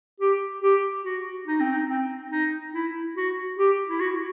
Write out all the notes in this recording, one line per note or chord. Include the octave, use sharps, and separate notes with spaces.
G4
G4
F#4
D#4
C4
D#4
C4
D#4
E4
F#4
G4
E4
F#4